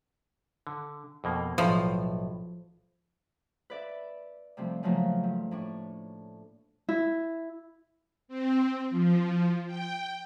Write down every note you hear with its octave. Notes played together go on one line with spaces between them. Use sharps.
D3
F2 B2 A#3
B1 A2 F3
B4 D5 E5
C3 F3 G3 A3 C4
C#3 F3 F#3 A3 A#3
G2
A2 D4 C#6
E4
C4
F3
G5